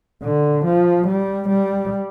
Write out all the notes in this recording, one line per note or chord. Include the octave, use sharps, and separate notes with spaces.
D3
F3
G3
G3